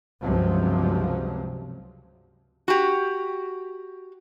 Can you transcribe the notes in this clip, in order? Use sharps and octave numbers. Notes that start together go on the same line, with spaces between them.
C#2 G2 C3 F3 F#3
F#4 G4